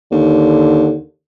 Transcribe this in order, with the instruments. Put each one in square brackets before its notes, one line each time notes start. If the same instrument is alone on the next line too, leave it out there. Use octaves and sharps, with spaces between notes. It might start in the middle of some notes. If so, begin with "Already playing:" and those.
[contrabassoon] D#2 [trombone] D3